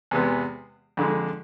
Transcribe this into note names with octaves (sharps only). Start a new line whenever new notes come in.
E2 C3 G#3 B3
F2 D3 G#3